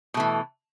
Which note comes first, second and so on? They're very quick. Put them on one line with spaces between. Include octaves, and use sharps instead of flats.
B2 A3 E3